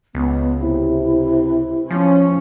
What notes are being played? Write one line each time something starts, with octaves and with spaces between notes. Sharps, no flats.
C#2 B3
C3 E4
F3 C#4